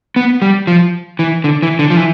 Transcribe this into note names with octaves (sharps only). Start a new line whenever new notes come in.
B3
G3
F3
E3
D3
E3
D3
F3
E3